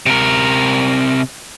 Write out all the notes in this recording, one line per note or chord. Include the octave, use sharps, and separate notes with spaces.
C3 A#4